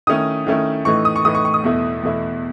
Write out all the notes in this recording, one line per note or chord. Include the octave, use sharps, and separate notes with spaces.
D#3 A3 C#4 E4 D#6
D#3 A3 C#4 E4
A2 E3 A3 D#4 C#6
D#6
C#6
A2 E3 A3 D#4 D#6
C#6
C#6
D#6
E2 B2 A3 E4
E2 B2 A3 E4